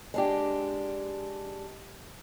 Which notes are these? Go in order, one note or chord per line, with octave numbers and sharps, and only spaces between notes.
G#3 D4 G4